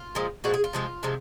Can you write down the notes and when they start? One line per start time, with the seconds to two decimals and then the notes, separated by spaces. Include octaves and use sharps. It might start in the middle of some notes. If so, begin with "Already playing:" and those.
Already playing: F4
0.15 A#2 F3 G#3
0.44 A#2 F3 G#3 F#4
0.54 G#4
0.64 F4
0.73 C3 F3 G#3
1.03 C3 F3 G#3